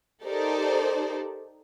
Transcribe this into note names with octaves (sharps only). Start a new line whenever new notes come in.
D#4 G4 A4 A#4 C5 D5